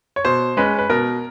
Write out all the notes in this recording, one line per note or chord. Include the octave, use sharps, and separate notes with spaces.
C#5
B2 C5
G#3 C#4 B4
B4
B2 A#4